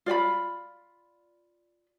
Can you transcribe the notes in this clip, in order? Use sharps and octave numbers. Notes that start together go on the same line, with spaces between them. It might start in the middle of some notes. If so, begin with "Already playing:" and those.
F4 D5 F#5 B5